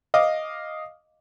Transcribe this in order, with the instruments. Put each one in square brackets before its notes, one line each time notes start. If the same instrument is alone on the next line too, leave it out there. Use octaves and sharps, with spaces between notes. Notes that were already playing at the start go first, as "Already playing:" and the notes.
[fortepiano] D#5 F5 D6